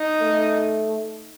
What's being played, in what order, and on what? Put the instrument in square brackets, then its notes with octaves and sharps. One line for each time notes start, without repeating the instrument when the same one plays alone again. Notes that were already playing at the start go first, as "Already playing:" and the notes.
Already playing: [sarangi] D#4
[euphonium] A3